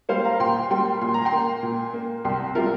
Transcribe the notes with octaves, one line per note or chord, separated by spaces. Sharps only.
G3 A#3 C5 F5
F5 A#5
A#2 G5 C6
G3 A#3 G5 C6
A#2 C6
A#5
G5 C6
A#3
A#2
A#3
C2 G5 C6
C3 G3 F4 A#4